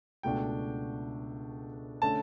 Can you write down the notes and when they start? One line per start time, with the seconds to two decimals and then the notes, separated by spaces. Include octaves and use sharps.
0.23 C#2 B2 A3 D4 F#4 G5
2.02 D3 A3 C#4 A5